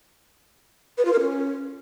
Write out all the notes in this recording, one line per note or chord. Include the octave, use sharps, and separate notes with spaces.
B4
F4
A#4
C#4